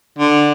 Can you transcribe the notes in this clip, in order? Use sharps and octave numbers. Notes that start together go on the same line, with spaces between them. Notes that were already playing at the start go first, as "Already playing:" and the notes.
D3